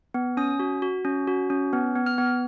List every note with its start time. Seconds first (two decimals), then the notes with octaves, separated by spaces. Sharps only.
0.14 B3
0.37 C#4 D#6
0.59 F#4
0.82 F#4
1.05 C#4
1.27 F#4
1.50 C#4
1.73 B3
1.96 B3
2.06 F6
2.18 B3